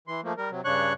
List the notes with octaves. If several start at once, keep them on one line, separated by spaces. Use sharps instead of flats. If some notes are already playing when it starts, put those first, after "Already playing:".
E3 C6
F3 A3 A#3
G3 A#4
C3 F#3
G2 C#3 D4 C#5 C#6 F#6